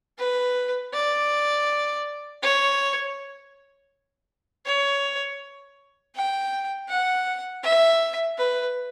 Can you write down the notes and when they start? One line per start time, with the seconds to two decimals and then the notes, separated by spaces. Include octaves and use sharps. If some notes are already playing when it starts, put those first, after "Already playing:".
0.18 B4
0.93 D5
2.43 C#5
4.66 C#5
6.15 G5
6.88 F#5
7.63 E5
8.38 B4